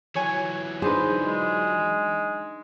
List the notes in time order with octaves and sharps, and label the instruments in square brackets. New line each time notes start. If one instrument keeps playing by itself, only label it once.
[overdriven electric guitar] E3 F#3 [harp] C#5 G#5
[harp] D4 D#4 B4 [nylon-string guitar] G#4 [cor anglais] C5
[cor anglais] G#3